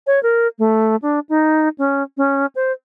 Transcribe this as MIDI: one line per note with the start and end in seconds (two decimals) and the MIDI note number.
0.07 0.22 73
0.23 0.47 70
0.59 0.96 57
1.02 1.19 62
1.29 1.69 63
1.78 2.03 61
2.17 2.46 61
2.55 2.72 72